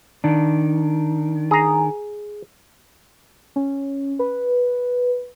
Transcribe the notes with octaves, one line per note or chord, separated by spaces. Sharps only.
D#3 D4
G#4 A#5
C#4
B4